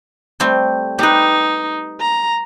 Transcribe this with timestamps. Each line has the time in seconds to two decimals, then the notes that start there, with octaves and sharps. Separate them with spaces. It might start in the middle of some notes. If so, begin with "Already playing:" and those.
0.40 G3 A3 C4
0.99 D#4 G4 B4
2.00 A#5